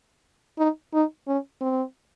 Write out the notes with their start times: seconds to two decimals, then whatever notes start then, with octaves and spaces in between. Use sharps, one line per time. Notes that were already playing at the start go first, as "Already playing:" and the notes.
0.58 D#4
0.93 D#4
1.28 C#4
1.61 C4